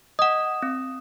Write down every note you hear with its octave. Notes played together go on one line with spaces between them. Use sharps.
D#5 F#5 D#6 E7
C4